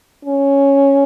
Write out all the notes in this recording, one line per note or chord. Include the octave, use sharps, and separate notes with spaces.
C#4